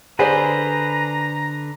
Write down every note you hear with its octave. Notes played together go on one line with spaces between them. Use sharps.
D3 G#4 B4 C5 D5 A#5